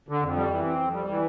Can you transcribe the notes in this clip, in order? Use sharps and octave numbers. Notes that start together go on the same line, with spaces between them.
D3
F2
G3
E3
C4
F2
G3
E3